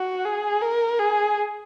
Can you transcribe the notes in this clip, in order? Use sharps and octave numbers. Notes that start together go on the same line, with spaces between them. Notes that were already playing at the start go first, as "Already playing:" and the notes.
Already playing: F#4
G#4
A#4
G#4